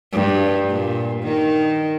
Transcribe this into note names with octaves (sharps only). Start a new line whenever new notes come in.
G2
A#2
D#3